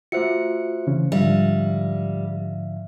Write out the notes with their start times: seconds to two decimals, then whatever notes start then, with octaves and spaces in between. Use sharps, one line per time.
0.12 A3 F4 F#4 C5 E5 C#7
0.87 C#3 E3 C#4
1.12 G#2 D3 F3 G3 E5 F5